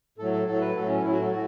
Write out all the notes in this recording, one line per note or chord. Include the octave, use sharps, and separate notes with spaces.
A2 F#3 A4
A4
A2 F#3 A4
B4
A2 F#3 A4
C#4
A2 F#3 E4
F#4
A4
A2 F#4